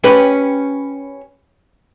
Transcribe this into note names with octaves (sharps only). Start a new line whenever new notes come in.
C#4 G4 B4